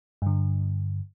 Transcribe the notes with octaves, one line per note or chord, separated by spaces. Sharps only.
G2 D3